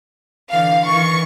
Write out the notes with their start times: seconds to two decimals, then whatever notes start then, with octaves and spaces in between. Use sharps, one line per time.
0.52 D3 E3 F5
0.87 D#3 E3 C#6